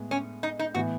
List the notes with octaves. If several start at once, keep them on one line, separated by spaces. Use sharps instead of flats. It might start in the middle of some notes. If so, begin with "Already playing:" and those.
Already playing: A2 G#3 B3
C#4
D#4
D#4
A2 E3 B3 E4 F#4